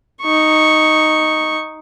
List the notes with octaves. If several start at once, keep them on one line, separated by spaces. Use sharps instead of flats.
D#4 C#6